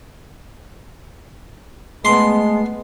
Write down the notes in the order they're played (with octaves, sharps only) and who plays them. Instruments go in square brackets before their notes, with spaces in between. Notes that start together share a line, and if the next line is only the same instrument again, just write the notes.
[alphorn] G#3 [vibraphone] A3 [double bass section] B3 [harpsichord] C6